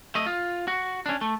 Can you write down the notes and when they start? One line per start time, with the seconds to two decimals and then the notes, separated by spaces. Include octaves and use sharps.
0.15 A3 D#5
0.26 F4
0.68 F#4
1.06 C#4 D4
1.21 A3